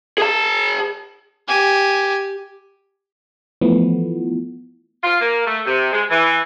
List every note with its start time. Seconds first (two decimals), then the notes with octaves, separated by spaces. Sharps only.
0.18 G#4 A5
1.48 G4 G#5
3.61 E3 F3 A3 B3
5.04 F4
5.21 A#3
5.47 A3
5.66 C3
5.92 G#3
6.10 E3